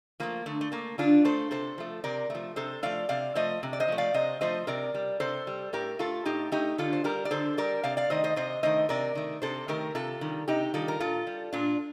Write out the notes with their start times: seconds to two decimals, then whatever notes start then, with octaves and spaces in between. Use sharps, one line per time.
0.20 F3 A3 A#3
0.46 D3 A3
0.61 A3
0.72 A3 A#3
0.98 D3 D4 F4
1.25 A3 A4 C5
1.51 C3 A4 C5
1.78 F3 A3
2.04 C3 A#4 D5
2.30 F3 A3
2.56 C3 A4 C5
2.83 F3 A3 D5 F5
3.09 C3 D5 F5
3.35 F3 A3 C5 D#5
3.63 C3
3.73 D5
3.80 C5 D#5
3.88 F3 A3
3.98 D5 F5
4.14 C3 C5 D#5
4.41 F3 A3 C5 D#5
4.67 C3 A#4 D5
4.94 G3
5.20 C3 A4 C5
5.47 G3
5.73 A2 G4 A#4
5.99 A3 F4 A4
6.25 A2 D#4 G4
6.52 A3 D#4 G4
6.78 D3 F4 A4
6.93 C5
7.04 G3 G4 A#4
7.25 D5
7.31 D3 A4 C5
7.58 G3 A#4 D5
7.83 C3 D5 F5
7.97 D5 F5
8.10 D#3 A3 C5 D#5
8.24 C5 D#5
8.36 C3 C5 D#5
8.63 D#3 A3 C5 D#5
8.89 C3 A#4 D5
9.15 D#3 A3
9.42 C3 A4 C5
9.68 D#3 A3 G4 A#4
9.95 C3 F4 A4
10.21 D#3 G3
10.48 C3 D#4 G4
10.74 D#3 G3 F4 A4
10.88 A#4
11.00 A#2 F4 A4
11.27 G3
11.53 A#2 D4 F4